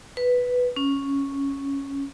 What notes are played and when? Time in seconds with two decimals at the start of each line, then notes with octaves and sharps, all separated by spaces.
0.17 B4
0.76 C#4